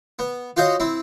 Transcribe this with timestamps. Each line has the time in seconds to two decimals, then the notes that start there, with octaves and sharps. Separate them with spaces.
0.19 B3
0.57 F4 F#4 C5 C#5 D#5
0.80 C4 E4